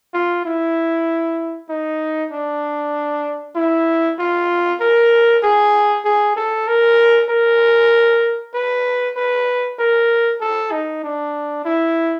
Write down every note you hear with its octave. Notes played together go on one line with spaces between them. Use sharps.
F4
E4
D#4
D4
E4
F4
A#4
G#4
G#4
A4
A#4
A#4
B4
B4
A#4
A4
D#4
D4
E4